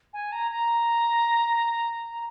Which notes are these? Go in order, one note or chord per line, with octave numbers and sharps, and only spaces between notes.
G#5
A#5
A#5